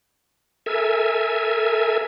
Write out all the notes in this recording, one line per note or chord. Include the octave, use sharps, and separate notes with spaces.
A4 A#4 E5 G#5